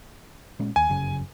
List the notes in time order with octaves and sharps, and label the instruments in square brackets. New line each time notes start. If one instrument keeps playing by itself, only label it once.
[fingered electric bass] A#2 G#3 C#4
[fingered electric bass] D#2 [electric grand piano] G#5
[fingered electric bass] G1 F#2 C#3